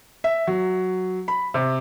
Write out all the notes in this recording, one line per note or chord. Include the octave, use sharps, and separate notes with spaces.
E5
F#3
B5
C3